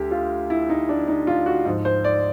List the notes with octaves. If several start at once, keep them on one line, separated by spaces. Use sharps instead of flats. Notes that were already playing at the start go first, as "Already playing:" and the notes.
Already playing: D2 G4
F4
E4
D#4
D4
D#4
F4
F#4
G#2 F3
C5
D5